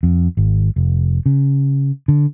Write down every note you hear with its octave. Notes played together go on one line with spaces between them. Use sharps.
F2
G#1
F1
C#3
D3